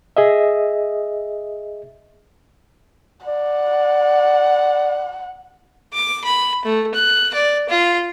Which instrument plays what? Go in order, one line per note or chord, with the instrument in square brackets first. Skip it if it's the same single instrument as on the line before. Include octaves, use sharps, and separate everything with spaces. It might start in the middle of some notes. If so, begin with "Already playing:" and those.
[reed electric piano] G#4 D#5 E5
[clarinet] D5 [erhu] F#5
[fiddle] D6
B5
A3
F#6
D5
F4